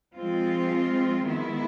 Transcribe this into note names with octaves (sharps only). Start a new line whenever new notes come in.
F3 G#3 C4 F4
D#3 G#3 B3 E4